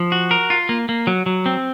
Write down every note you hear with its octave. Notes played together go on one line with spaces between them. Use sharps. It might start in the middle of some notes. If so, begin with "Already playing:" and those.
Already playing: F3
F#4
A#4
F4
A#3
A#3
F#3
F#3
C4